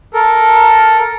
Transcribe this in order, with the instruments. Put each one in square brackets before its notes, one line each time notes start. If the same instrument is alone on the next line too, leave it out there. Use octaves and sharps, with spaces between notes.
[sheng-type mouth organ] A4 A#4